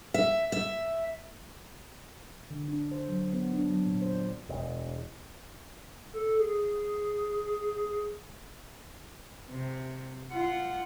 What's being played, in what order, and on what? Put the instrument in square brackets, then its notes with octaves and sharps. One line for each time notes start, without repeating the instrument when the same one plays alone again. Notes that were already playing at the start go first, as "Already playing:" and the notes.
[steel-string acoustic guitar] E5
E5
[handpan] D3
D4
C5
F#3
B3
D4
F#3
A#2
C5
D5
[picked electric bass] E1
[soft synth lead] A4
G#4
[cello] C3
F4 F#5